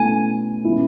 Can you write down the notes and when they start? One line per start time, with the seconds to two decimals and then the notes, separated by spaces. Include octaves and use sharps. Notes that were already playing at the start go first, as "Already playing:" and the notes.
Already playing: B2 A3 C#4 E4 A4 G#5
0.64 B2 G#3 C#4 E4